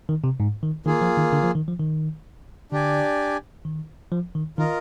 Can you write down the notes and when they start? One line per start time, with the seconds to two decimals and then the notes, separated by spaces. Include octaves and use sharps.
0.09 D#3
0.24 C3
0.40 G#2
0.63 D#3
0.86 D#3 A#3 F4 G#4
1.02 F3
1.17 D#3
1.33 D3
1.44 F3
1.55 D#3
1.68 F3
1.80 D#3
2.72 D3 D4 G4 D5 G#5
3.65 D#3
4.12 F3
4.35 D#3
4.58 D#3 F4 A#4 D#5